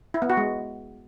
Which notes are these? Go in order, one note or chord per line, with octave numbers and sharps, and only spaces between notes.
E4
B3
F#4
G#3